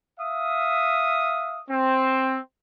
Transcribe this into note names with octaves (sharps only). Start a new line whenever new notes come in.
E5 F5 D#6
C4